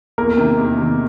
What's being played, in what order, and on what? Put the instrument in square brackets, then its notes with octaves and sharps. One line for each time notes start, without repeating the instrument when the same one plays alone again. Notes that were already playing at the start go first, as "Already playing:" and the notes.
[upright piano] E2 [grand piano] A#3 A#4
[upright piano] C3 D#3
E2
C3 D#3